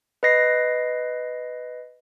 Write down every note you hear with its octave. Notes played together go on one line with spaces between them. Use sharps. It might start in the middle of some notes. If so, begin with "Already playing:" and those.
B4 D#5 A#6 C7